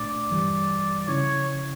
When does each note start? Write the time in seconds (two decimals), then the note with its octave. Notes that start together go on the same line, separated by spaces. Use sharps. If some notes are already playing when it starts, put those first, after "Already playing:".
Already playing: A#2 A3 D4 D5
0.31 G2 E3 G3
1.08 C#3 F3 C#4 E4 C#5